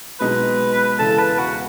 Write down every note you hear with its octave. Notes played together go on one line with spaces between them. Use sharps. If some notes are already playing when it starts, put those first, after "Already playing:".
B1 B2 G#3 D#4 F#4 B4
E1 E2 C#3 E3 A4
B4
F#4